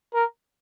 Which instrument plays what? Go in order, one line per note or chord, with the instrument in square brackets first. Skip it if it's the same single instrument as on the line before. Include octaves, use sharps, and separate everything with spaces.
[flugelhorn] A#4